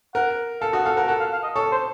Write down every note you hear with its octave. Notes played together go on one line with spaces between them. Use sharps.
A#4 F#5
A4 F5
F#4 D#5
A4 F5
A#4 F#5
A4 F#5
F5
F5
D#5
A4 C#5
C5